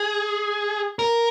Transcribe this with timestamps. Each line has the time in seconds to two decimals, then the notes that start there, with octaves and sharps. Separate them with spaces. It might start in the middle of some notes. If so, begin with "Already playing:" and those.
Already playing: G#4
0.99 A#4